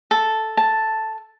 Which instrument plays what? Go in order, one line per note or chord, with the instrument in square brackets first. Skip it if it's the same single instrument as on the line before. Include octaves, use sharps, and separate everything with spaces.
[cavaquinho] A4
A5